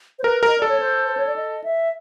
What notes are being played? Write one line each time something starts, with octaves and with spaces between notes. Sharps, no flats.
C5
A#4 B4
A#4 D#5
A4 D5
C#5
C5
C5
C#5
D5
D#5
E5